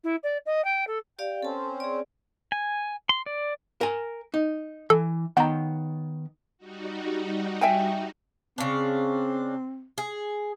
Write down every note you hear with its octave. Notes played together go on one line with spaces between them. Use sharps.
E4
D5
D#5
G5
A4
G4 D5 F5 G5
C4 C#4 A4 A5
G#4 D5
G#5
C6
D5
A#4 G#5
D#4
E3 A4
D#3 B3 F#5 G5 A#5
G3 D#4 F#4
E5 G5 G#5
C#3 C4 D4
G#4